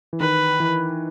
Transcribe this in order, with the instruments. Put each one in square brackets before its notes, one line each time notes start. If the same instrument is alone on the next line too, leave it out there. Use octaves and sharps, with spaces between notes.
[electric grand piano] E3
[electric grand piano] D#3 [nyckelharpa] B4
[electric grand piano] E3